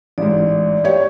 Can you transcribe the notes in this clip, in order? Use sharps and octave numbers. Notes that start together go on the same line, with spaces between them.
A1 G#2 D5
G4 C#5